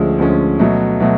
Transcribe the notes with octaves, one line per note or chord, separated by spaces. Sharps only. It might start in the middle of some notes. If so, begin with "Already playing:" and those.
Already playing: D2 D3 F3 G#3 C#4
D2 D3 F3 G#3 C#4
B2 F#3 A3
B2 F#3 A3